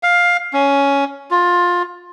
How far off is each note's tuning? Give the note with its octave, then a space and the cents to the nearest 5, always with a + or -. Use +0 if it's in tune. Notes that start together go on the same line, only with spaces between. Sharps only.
F5 +10
C#4 +10
F4 +15